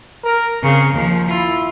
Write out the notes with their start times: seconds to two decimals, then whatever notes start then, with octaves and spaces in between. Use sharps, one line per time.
0.24 A#4
0.63 C#3 C4 A#4
0.94 D#2 F3
1.29 E4 F4